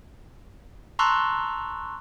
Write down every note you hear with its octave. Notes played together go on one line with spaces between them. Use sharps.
A5 A#5 C6 C#6 E6 F#6